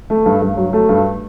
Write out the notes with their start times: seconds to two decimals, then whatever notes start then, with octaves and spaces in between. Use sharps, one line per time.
0.10 A3
0.26 G2
0.42 G2
0.57 F#3
0.73 A3
0.89 G2